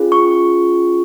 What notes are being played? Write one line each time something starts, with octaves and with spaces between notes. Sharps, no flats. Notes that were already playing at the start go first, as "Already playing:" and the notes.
Already playing: C#4 F4 G#4
C#6